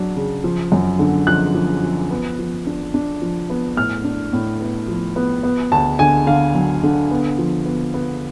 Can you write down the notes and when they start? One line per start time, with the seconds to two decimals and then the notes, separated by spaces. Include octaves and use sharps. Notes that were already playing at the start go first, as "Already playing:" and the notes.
Already playing: F#3 D4
0.16 C#3
0.44 F3
0.72 F#2
0.99 D3
1.27 F3 F#6
1.55 F3
1.83 F3
2.11 B3
2.39 F3
2.67 D4
2.94 D4
3.22 F3
3.50 B3
3.77 A2 F6
4.04 D4
4.33 A2
4.61 B3
4.88 F3
5.16 B3
5.43 B3
5.72 D2 A5
5.99 D3 G#5
6.27 D3 F5
6.55 F#3
6.83 D3
7.11 B3
7.38 F3
7.66 B3
7.94 B3